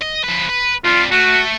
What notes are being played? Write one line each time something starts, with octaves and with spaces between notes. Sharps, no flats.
D#5
F3 B4
B4
F2 G3 F4
A3 F#4